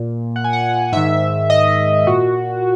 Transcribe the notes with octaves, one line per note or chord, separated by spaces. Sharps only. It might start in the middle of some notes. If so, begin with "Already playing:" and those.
Already playing: A#2
F#5
G#5
F#5
G#2 D#3 E5
D#5
A#2 F#4